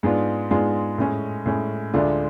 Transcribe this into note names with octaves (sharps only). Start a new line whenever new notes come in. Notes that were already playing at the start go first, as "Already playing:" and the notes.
G#2 G#3 B3 D4 F4
G#2 G#3 B3 D4 F4
A2 G#3 C#4
A2 G#3 C#4
D2 D3 G#3 D4 F4